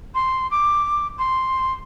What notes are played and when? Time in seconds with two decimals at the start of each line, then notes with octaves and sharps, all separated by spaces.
0.15 C6
0.51 D6
1.19 C6